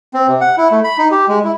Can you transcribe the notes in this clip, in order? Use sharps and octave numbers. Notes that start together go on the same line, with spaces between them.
C4
C3
F#5
E4
A3
B5
D#4
G4
G#3
E4